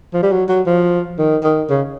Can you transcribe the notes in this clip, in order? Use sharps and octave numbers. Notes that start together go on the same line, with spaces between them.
F3
G3
F#3
F#3
F3
D#3
D#3
C#3